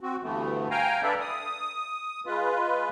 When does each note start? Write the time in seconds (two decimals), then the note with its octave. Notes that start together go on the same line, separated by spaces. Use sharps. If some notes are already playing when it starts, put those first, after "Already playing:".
0.01 C4 F#4
0.23 D2 G2 E3 A3 B3
0.71 F5 G5 G#5 A#5
1.03 D4 A4 B4 D5 E5
1.20 D#6
2.26 G#3 F4 B4